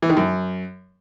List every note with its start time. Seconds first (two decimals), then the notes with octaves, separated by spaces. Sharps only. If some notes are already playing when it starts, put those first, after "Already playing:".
0.02 E3
0.10 D#3
0.17 F#2